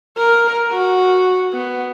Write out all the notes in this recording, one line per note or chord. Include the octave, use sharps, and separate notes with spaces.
A#4
F#4
B3